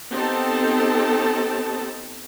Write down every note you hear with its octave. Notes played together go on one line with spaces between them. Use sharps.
B3 C4 D#4 G4 A4 A5